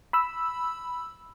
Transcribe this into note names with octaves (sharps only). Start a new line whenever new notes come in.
B5 E6